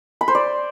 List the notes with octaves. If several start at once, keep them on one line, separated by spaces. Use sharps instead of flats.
B5
C5
D5